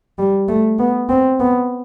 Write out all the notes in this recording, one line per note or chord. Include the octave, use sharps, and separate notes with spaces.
G3
A3
B3
C4
B3